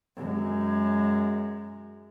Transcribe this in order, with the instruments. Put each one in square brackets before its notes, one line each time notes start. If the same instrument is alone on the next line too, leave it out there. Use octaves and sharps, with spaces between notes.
[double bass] F#2 G#3